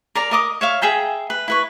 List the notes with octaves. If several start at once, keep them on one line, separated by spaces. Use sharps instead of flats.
A#4 D5 A#5
A#4 D#5 D6 D#6
C#5 E5 F5
G#4 E5 G5 A#5
B4
E4 B4 C#6